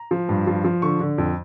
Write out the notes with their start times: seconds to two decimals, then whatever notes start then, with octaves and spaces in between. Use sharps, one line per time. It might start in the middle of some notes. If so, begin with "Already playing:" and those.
Already playing: A#5
0.11 F3
0.29 G2
0.47 F3
0.64 F3
0.82 D3 C#6
1.00 D3
1.18 F2